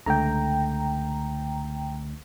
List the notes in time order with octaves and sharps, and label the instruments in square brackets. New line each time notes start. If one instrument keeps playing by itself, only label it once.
[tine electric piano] C#2 D3 A3 [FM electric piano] G5 A#5